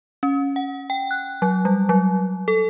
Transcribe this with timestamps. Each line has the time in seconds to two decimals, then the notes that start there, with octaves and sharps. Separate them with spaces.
0.23 C#4
0.56 F#5
0.90 G5
1.11 F#6
1.42 F#3
1.65 G3
1.89 F#3
2.48 A4